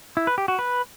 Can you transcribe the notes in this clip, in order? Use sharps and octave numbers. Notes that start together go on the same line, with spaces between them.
E4
B4
G4
F#4
B4